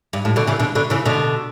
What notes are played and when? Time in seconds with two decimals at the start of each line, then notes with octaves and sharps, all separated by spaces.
0.13 G2
0.25 A2
0.36 B2 D3
0.47 C#3 E3
0.59 B2 D3
0.75 B2 D3
0.90 C#3 E3
1.06 B2 D3